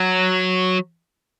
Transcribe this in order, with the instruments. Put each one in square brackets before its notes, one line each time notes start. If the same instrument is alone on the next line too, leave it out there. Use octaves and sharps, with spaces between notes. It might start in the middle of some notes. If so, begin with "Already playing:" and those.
Already playing: [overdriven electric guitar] F#3